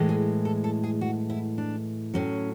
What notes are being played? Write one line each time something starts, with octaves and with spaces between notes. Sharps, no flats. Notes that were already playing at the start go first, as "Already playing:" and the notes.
Already playing: A2 E3 G#3
G#4
A4
A4
G#4
F#4
E4
D4
A2 F#3 C#4